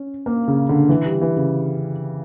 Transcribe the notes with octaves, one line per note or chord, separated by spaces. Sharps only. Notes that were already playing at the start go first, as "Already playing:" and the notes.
Already playing: C#4
A#3
C#3
D3
E3
G3
E3
C#3